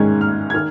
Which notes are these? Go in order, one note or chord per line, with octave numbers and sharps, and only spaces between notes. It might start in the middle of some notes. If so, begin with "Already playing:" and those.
Already playing: G#2 D#3 G#3 C#4 G#6
F6
G#6
D#3 F6